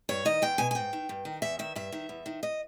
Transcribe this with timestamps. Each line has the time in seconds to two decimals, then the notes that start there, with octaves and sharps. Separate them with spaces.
0.09 G2 C#5
0.25 D#3 D#5
0.42 E2 G5
0.58 B2 G#5
0.71 G#5
0.75 G#2 G5
0.93 D#3
1.09 G2
1.25 D#3
1.42 E2 E5
1.59 D#3 E5
1.75 G2 E5
1.92 D#3
2.09 E2
2.26 D#3
2.43 D#5